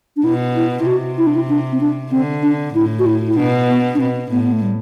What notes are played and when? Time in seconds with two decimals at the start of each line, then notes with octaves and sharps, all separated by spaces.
0.17 D4
0.24 B2 E4
0.56 E4
0.80 E4
0.86 C3 F#4
1.18 E4
1.27 D4
1.36 E4
1.49 D4
1.72 C4
1.81 D4
2.11 D3 C4
2.43 D4
2.75 A2 E4
2.99 F#4
3.06 E4
3.27 E4
3.37 B2 D4
3.68 B3
3.94 D4
3.99 B2 C4
4.31 A2 B3
4.43 B3
4.53 A3
4.62 G3